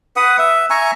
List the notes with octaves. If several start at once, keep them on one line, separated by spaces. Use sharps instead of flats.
B4 F#5 D#6
E5
E5 G#5 A#5 C#6